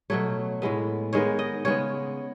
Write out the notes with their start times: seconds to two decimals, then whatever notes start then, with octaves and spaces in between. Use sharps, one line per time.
0.10 B2 F#3 A3 C#5
0.62 A2 G#3 B3
1.13 D#3 G#3 B3 C#5
1.39 D#5
1.65 C#3 G#3 B3 C#5